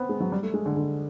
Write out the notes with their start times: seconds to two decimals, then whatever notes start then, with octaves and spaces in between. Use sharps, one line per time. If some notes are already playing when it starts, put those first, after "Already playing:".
Already playing: B3 C4
0.09 G#3
0.20 F#3
0.32 G3
0.43 A3
0.54 G#3
0.66 D3
0.76 D3